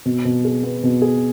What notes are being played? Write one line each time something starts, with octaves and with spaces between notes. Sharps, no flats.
B2
B2
G#4
B3
B2
G#4